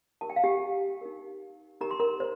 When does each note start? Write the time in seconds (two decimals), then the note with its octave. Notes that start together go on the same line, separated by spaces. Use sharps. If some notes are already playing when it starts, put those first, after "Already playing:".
0.21 D#4 G4 A#4 A5
0.30 G5
0.36 F5
0.44 G4 G5
1.01 D#4 G4 A#4
1.81 D#4 G4 A#4 A#5
1.91 C6
2.00 A#4 A#5
2.20 C5